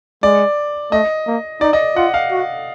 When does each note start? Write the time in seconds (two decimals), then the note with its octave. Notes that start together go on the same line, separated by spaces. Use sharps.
0.23 G#3 D5
0.92 A3 D#5
1.27 A#3
1.61 D#4 D5
1.73 D#5
1.96 F4 F#5
2.14 F5
2.31 F#4